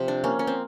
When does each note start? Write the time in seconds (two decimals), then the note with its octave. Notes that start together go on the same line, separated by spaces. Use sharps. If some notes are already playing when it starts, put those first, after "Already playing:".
Already playing: C3 F3
0.08 D4
0.24 A#3 C#4
0.39 C#4
0.47 C4